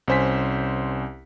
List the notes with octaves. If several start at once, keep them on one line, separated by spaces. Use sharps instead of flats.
C2 C#4 C5 G#5 B6